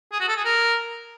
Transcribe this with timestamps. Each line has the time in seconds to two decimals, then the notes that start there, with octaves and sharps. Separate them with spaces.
0.12 G#4
0.20 F#4
0.28 A4
0.37 G#4
0.45 A#4